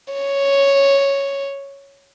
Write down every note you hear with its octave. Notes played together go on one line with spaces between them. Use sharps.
C#5